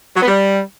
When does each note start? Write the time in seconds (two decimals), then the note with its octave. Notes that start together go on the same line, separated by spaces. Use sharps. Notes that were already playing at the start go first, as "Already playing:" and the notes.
0.16 F#3
0.22 B3
0.27 G3